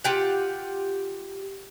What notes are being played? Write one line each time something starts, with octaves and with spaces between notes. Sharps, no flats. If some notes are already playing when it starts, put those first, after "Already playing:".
F4 G4 F#5